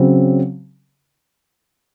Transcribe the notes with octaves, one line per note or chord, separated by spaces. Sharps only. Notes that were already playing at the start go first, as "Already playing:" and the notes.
Already playing: C#3 F#3 C4